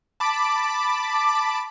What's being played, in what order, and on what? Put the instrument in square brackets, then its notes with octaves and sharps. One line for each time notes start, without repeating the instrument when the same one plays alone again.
[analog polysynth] A5 B5 D6